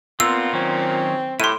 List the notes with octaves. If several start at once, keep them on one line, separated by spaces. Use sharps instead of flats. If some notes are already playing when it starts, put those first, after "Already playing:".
A#2 B3 C4 F4 E6
D#3 F#3 C4 C#4
A2 E4 G4 C6 D#7